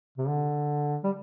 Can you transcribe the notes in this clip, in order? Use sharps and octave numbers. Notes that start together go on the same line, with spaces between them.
C3
D3
G3